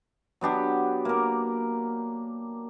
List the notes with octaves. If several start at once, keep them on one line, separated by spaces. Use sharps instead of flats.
F#3 B3 D4 G4
A#3 A#4